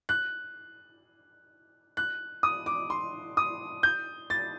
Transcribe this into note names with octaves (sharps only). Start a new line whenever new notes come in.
F#6
F#6
D#6
D6
C6
D#6
G6
A6